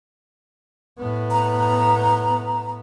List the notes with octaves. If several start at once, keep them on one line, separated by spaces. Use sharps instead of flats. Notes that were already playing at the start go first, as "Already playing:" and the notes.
A2 B3
A#5